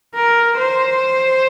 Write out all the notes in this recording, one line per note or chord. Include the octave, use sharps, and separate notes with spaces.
A#4
C5